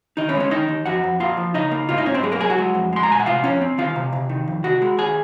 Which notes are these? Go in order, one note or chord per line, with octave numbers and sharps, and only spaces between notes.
D#3 D#4 D#5
C#4 C#5
G#3
C#4 C#5
D#3 D#4 D#5
D#2
F2 F#4 F#5
F2
A#3 F4 F5
F3
C#3 D#4 D#5
A#3
G#2 F4 F5
D#4 D#5
G#2 C#4 C#5
C4 C5
F#3 G#3 G#4
A#3 A#4
F#3 G#4 G#5
F#4 F#5
G#3
F2
G#3 C6
A#5
A#2 G#5
F#5
C3 F4 F5
F2 C#4 C#5
C4
D#3 F4 F5
C3
C3
D#3
F2
C3 F#4 F#5
G#3
D#2 G#4 G#5